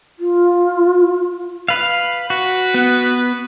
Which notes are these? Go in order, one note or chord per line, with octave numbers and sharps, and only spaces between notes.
F4
B4 F5
F#4 B4
B3